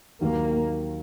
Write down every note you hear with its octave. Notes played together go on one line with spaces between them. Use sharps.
D#2 D#3 F#3 A#3